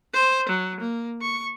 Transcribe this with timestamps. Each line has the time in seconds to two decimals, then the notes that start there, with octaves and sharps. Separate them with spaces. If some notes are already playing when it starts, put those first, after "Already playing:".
0.13 C5
0.49 F#3
0.80 A#3
1.22 C#6